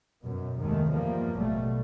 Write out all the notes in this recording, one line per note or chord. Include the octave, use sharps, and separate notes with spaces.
F#2 B2
F1 D#2 D#3 G#3 A3
E2 G2 F3 G3 A#3
A1 B2 F#3 G3 A3